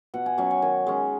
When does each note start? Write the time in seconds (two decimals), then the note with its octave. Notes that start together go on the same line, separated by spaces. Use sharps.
0.14 B2 F#5
0.26 G#5
0.38 F#3 C#4 G#5
0.51 G#5
0.62 D#3 G#5
0.87 G#3 C#4